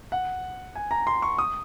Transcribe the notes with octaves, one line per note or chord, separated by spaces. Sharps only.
F#5
G#5
A#5
C6
C#6
D#6